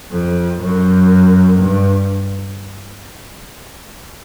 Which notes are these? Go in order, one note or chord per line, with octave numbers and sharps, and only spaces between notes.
F2
F#2
G2